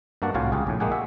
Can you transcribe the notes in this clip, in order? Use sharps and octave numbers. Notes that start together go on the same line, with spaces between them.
G2 A#3 D4 F#4 D5 F#5
C2 A2 F4 F#4 F5 G#5
C#2 F4 G4 G#4
A#1 A2
G#3 A#3 G4 G#4 F#5 G#5
F#4 E5 F#5